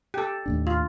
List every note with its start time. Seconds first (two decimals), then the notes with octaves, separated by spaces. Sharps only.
0.14 G4 A4
0.46 D#2 A2 D4
0.67 F4